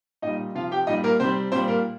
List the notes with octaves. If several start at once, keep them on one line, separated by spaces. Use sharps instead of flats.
A#2 G3 D#4 D#5
C3 F3 F4 F5
G4 G5
A#2 G3 D#4 D#5
A#3 A#4
C3 G3 C4 C5
A#2 G3 C4 C5
A#3 A#4